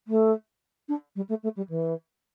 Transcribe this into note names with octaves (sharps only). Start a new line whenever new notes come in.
A3
D4
G3
A3
A3
G3
E3